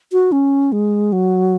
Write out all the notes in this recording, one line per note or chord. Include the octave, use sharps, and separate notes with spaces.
F#4
C#4
G#3
F#3